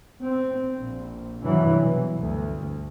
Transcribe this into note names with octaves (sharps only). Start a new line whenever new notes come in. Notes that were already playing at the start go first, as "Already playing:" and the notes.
C4
A#1
G2 C3 E3 F#3
B2
D2